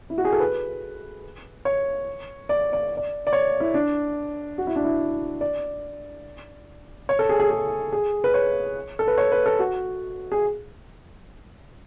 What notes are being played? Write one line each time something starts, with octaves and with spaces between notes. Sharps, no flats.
E4
F#4
G#4
A4
B4
C#5
D5
D5
D5
D5
C#5
E4
D4
F#4
E4
D4
E4
D5
C#5
A4
G#4
G#4
G#4
G#4
B4
C#5
A4
B4
C#5
B4
A4
F#4
G#4